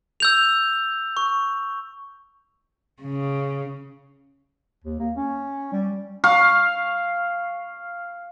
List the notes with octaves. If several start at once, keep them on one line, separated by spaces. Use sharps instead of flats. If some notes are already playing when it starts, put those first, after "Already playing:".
E6 G6 F7
C#6
C#3
D#2
A#3
C#4
G3
F5 C#6